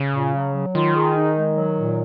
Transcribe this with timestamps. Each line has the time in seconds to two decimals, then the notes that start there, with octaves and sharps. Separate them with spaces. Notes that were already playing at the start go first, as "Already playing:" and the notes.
Already playing: C#3
0.14 A#2
0.34 F#3
0.53 F#3
0.75 D#3 F4
0.95 G#4
1.16 D#4
1.36 G#3
1.56 F#3
1.77 A#2